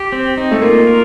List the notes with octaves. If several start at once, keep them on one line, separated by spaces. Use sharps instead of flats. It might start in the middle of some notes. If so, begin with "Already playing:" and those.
Already playing: G4
C4
D#4
A3
A#3 F4
A#4